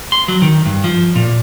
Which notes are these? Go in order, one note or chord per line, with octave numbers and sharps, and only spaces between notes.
C6
F#3
D#3
G2
F3
A#2